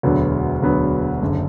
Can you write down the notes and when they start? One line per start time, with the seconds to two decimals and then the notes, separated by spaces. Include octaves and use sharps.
0.03 E1 D2 D3 F#3 B3
0.62 E1 D2 D3 F#3 B3
1.22 F#1 F#2 D3